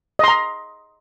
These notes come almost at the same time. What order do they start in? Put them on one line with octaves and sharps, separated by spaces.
D#5 C6 A#5